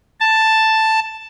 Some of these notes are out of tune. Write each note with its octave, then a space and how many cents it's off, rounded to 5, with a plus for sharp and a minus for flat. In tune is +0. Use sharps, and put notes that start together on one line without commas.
A5 +5